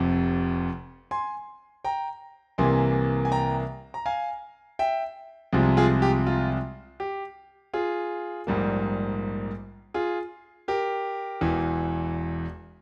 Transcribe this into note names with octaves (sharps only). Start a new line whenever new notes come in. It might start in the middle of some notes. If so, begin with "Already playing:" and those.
Already playing: F1 F2 C3
G#5 C6
G5 A#5
C2 C3 E3 A#3 G#5 C6
G#5
G5 A#5
A#5
F5 G#5
E5 G5
C2 C3 F3 G#3
F4 G#4
G4
F4
G4
F4 G#4
A#1 G#2 G3 A#3
F4 G#4
G4 A#4
E1 E2 E3